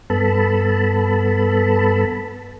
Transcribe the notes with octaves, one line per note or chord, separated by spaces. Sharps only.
G2 B3 A4 A5 B5